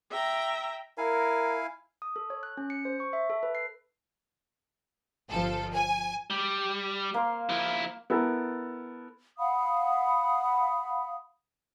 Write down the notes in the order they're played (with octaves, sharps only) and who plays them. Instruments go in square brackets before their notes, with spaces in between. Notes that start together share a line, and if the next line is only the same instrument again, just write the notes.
[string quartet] E5 G5 A#5
[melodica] E4 F5 G#5 [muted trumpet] A#4
[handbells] D#6
A4
C#5
F#6
C#4
C#7
C5
C#6
E5
A4
B4
C7
[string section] G1 F3 A4
G#5
[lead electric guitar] G3
[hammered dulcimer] A#3 F5 C6
[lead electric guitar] F3 E4
[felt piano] B3 E4 A4 A#4 G#5
[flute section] F5 F#5 B5 D#6